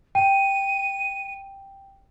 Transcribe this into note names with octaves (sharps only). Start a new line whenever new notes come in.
G5 D#7